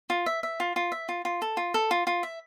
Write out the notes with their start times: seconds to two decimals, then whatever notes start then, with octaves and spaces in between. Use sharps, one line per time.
0.10 F4
0.26 E5
0.43 E5
0.60 F4
0.76 F4
0.92 E5
1.09 F4
1.25 F4
1.42 A4
1.57 F4
1.74 A4
1.91 F4
2.07 F4
2.23 E5